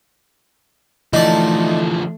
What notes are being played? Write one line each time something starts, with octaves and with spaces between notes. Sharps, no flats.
D3 E3 F3 A3 D#4 D5